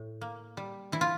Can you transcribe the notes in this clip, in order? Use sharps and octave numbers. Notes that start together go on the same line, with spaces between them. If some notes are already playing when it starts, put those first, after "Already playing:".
Already playing: A2
A#3
G3
E3 E4
F4